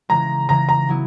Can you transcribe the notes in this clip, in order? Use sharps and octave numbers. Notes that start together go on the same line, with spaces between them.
C#3 E3 G#3 A#5
C#3 E3 G#3 A#5
A#5
F#3 B3 E4